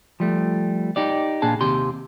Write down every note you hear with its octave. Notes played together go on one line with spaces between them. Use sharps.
F3 G3 A3
D#4 G4 D5
A#2 D4 G#4 A5
D#2 C3 G4 C6